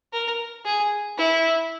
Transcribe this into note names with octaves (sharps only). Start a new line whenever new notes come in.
A#4
G#4
E4